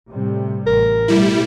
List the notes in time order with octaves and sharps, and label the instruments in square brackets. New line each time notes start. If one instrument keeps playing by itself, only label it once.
[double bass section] A2 C3 G3
[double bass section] A1 [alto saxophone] A#4
[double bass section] B2 A3 [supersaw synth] G3 E4